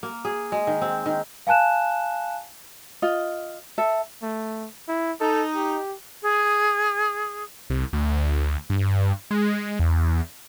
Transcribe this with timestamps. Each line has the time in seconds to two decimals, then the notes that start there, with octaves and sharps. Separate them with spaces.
0.03 A#3
0.25 G#4
0.52 G#3
0.67 D#3
0.82 C4
1.06 D#3
1.47 F5 G#5 A5 F#6 E7
3.02 F4 D#5
3.78 A4 E5
4.23 A3
4.88 E4
5.21 D#4 A4
5.56 G4
6.23 G#4
7.70 C2
7.93 D2
8.70 G2
9.31 G#3
9.79 E2